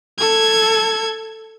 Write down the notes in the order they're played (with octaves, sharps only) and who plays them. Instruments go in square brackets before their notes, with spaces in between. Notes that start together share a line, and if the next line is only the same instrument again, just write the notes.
[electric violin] A4 G#6